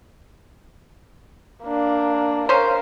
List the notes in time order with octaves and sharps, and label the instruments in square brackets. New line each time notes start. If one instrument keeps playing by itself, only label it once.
[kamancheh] A#3 D4
[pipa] C#4 C5 [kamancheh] A#4 F5